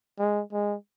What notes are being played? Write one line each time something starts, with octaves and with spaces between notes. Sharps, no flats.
G#3
G#3